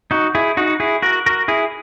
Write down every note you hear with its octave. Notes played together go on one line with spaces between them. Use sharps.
D#4 F#4
E4 G#4
D#4 F#4
E4 G#4
F#4 A#4
F#4 A#4
E4 G#4